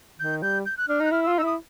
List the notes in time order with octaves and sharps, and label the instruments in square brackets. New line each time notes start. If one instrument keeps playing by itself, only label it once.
[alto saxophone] D#3 [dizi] G6
[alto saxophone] G3 [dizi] G6
[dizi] G6
F#6
[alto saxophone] D4 [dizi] F6
[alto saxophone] D#4
[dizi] F#6
[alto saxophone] E4 [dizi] F6
[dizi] E6
[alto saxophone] F4
[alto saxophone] D#4 [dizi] E6
[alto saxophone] E4 [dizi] D#6